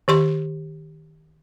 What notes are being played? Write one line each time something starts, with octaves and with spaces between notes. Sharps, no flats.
D#3 G4 C6